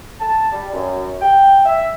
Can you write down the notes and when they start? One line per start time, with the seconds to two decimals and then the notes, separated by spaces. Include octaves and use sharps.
0.20 A5
0.53 G3
0.73 F#2
1.22 G5
1.66 E5